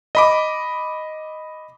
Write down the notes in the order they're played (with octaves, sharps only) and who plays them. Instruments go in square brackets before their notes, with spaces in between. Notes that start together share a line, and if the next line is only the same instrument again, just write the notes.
[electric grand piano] D#5 B5 D6